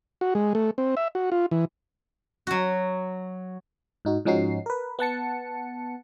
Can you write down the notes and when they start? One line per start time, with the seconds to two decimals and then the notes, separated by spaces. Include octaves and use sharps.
0.21 F#4
0.35 G#3
0.55 A3
0.78 C4
0.97 E5
1.15 F#4
1.32 F4
1.51 E3
2.47 F#3 F#4
4.05 G#2 D#4 F#4
4.25 G#2 F3 C#4 D#4 F#4 C7
4.66 A#4 B4
4.99 B3 F#5 A5 C#7